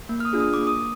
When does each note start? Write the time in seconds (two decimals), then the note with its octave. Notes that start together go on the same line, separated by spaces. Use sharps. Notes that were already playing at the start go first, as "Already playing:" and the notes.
0.09 A#3
0.20 F6
0.25 D#6
0.33 D4 F4 G#4
0.40 D#6
0.54 A#3 D6
0.67 D#6